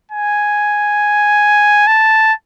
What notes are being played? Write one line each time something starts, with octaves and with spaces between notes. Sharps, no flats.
G#5
A5